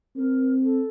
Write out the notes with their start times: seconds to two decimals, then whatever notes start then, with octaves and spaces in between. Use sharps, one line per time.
0.15 C4 A#4
0.62 A4